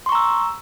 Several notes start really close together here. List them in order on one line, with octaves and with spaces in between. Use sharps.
C6 C#6 A#5 E6